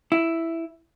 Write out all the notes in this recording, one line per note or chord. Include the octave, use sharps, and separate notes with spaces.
E4